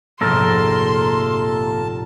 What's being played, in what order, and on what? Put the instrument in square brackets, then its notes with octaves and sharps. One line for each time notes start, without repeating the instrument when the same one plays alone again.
[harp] F1 A#1 G#2 [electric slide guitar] A#3 A4 A#4 [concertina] A5 [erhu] C6